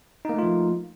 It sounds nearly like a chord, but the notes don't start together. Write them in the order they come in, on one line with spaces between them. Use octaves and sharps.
D#4 A#3 A3 F4 F3